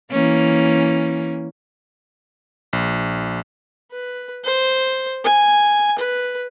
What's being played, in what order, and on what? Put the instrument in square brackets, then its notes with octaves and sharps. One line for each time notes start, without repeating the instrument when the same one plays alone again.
[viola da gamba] E3 A#3 C#4
[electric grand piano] A#1
[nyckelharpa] B4
C5
G#5
B4